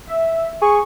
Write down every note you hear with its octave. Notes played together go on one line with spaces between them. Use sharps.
E5
G#4 C#6